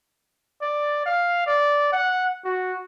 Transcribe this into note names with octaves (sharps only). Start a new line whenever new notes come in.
D5
F5
D5
F#5
F#4